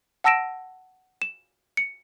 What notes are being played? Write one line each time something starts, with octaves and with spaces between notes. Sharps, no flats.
F#5 A5 E6 A#6 D7 E7
E7
C#7